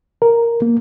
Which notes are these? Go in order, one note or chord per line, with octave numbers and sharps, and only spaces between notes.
A#4
A#3